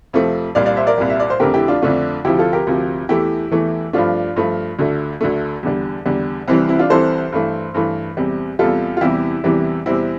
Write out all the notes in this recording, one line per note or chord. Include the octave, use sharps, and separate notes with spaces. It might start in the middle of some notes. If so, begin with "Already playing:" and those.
F2 C3 F3 A3
C2 A#2 G3 D5 F5
D5 F5
C5 E5
A#4 D5
C2 A#2 G3
E5
D5
C5
F2 D3 A3 G4 A#4
E4 G4
D4 F4
F2 D3 A3 D4 F4
D2 C3 F3 E4 G4
F4 A4
G4 A#4
D2 C3 F3
E2 E3 A3 E4 G4
E2 E3 A3
G2 F3 A3 D4 F4
G2 F3 A3
D2 D3 A3
D2 D3 A3
E2 D3 G3
E2 D3 G3
C2 C3 E3 G3 C4
C4 E4
D4 F4
C2 C3 E3 G3 A4 C5
G2 E3 A3
G2 E3 A3
E2 C3 G3
E2 C3 G3 F4 A4
F4
E2 C3 E3 G3 E4 G4
E2 C3 E3 G3
E2 C3 G3 C4 E4